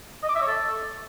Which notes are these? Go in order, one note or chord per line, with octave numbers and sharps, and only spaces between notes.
D#5
D6
E5
C#5
A4